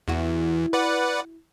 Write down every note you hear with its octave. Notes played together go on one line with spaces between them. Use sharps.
E2 E4 F#4
B4 D5 F#5